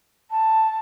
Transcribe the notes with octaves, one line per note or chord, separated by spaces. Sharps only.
A5